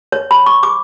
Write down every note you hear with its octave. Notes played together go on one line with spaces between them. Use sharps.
C#5
B5
C#6
D6